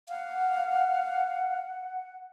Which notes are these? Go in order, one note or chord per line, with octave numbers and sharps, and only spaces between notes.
F5 F#5